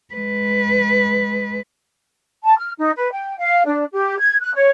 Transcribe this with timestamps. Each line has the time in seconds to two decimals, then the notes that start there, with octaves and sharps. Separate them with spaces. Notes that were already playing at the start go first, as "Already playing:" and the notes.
0.14 G#3 B4
2.44 A5
2.58 F6
2.78 D#4
2.97 B4
3.11 G5
3.40 F5
3.66 D4
3.93 G4
4.21 G#6
4.40 F#6
4.54 C#5